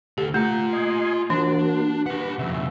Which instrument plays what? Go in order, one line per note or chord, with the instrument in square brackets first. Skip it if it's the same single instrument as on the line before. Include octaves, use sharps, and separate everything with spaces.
[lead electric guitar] D2 A4 [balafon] G4
[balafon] A3 [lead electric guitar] F4 A#5
[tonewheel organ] D#5 G#5 C6
[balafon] E3 [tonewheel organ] A#3 F#4 [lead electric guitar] D4
[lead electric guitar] G4 F#5 [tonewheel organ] B4
[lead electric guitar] F2 C#3 [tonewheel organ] E5